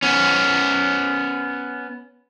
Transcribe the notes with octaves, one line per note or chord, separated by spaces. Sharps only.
B3 C#4